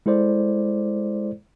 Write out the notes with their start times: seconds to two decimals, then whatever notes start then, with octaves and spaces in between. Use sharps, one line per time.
0.06 G#3 E4 A4 C5 D5